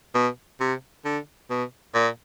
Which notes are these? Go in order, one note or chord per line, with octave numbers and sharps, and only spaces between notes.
B2
C3
D3
B2
A#2